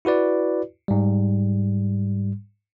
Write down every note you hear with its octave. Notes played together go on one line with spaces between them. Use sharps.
E4 F#4 B4 D5
G#2 G3